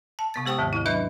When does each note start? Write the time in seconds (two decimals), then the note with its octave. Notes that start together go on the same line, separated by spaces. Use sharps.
0.19 A5
0.34 C3 B3 A6
0.46 G#3 G4 C5 G5 C#6 D#6
0.58 D#2 G#2 D#3 F3
0.73 F3 E4
0.86 F#3 C#4 D4 B4 D#5 E5